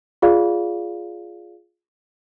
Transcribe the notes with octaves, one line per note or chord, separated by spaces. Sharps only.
F4 G#4 D5 F5